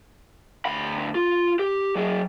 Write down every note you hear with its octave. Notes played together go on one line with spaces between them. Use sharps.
D2 B5
F4
G4
F#3 G#4